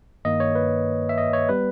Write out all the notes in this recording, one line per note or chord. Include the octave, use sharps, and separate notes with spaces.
G2 D#3 A#3 D#5
C#5
B4
E5
D#5
C#5
G3 B3 B4